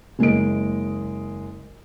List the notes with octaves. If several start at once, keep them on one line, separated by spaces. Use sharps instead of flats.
F#1 G#3 A#3 D#5 D7